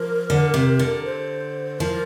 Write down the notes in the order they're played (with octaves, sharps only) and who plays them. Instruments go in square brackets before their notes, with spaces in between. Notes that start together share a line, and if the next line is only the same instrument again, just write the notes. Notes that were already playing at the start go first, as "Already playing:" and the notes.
Already playing: [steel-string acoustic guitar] F3 [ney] A#4
[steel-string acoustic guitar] D3
C3
D3
[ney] C5
[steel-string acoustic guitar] F3 [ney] A#4